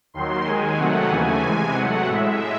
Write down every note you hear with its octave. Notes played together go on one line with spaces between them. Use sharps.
D#2 D#3 F#3 C6
D#2 D#3 G#3 G#5
C3 D#3 F#3 A3 F#5
D#2 C#3 E3 A3 G#5
C3 E3 G#3 G#5
C3 F#3 A3 F#5
A2 G#3 E5